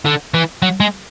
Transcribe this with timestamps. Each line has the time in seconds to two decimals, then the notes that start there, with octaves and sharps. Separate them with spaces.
0.06 D3
0.34 E3
0.62 F#3
0.80 G#3